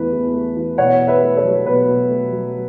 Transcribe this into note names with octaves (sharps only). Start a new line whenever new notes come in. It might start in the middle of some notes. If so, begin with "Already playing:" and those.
Already playing: E2 E3 A3 B4
E2
A3
E3
B2 C#5 F#5
B2
B4 E5
A3
A4 C#5
F#3
B2 B4
B2
A3
F#3